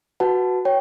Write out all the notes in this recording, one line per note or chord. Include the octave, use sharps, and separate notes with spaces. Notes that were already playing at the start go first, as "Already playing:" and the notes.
F#4 B4 F#5 A5
C#5 G5